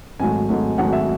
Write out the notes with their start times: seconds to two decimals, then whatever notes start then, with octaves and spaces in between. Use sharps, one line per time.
0.19 G#1 G#2 F#3 A3 G#5
0.49 G#1 G#2 F#3 A3
0.78 G#1 G#2 F#3 A3 F#5
0.93 E5